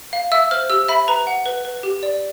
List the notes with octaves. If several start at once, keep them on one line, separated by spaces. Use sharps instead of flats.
F5
E5 E6
C5 F6
G4 E6
E5 B5
B4 A#5
F#5
B4
B4
G4
D5